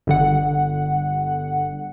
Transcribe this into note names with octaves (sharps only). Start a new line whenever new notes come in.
G1 D3 F#5